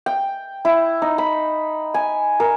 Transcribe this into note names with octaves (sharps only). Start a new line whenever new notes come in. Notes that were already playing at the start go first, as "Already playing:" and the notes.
G5
E4
D#4
B5
G#5
A#4